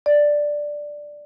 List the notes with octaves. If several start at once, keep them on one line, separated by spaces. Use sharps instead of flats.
D5